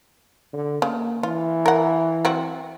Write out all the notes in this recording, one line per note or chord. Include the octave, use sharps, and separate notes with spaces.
D3
C#3 A#3
E3 F4
A#4 F#5
F#3 C4 F#4